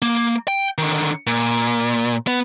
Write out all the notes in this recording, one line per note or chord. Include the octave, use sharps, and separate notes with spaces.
A#3
G5
D3 D#3
A#2
B3